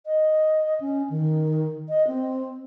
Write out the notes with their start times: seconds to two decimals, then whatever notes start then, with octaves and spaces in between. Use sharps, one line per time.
0.06 D#5
0.80 C#4
1.10 D#3
1.89 D#5
2.07 C4